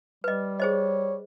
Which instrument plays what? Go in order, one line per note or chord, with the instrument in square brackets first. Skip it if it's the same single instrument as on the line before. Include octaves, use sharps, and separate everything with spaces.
[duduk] G3 [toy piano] B4 D#5
[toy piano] G#4 C5 D#5 [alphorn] C#5